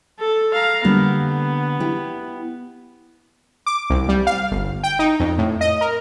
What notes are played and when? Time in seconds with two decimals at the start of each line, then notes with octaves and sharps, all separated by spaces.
0.19 A4
0.54 F5 A#5
0.84 D3 G3 A#3 B3
1.80 E4 G4
3.66 D6
3.90 C2
4.09 G3
4.27 F5
4.52 G1
4.83 G5
4.99 D#4
5.20 F2
5.38 A2
5.61 D#5
5.81 A#4